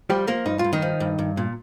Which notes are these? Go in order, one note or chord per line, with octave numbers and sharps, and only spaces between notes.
F3 G3 G4
F3 A#3 A#4
G2 D#4
F4
G2
D#3 D#4
F3
G2
G2
A#2